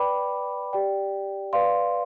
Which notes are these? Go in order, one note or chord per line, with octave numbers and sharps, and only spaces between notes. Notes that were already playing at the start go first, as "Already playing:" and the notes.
Already playing: B4 D5 G5 B5 D6
G4 D5 G5
B4 D5 F5 C6